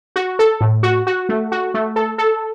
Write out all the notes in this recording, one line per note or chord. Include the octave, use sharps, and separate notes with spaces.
F#4
A4
A2
F#4
F#4
A3
F#4
A3
A4
A4